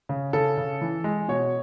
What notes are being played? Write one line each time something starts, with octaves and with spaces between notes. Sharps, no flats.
C#3
C#3 A4
C#3
E3
G#3
B2 C#5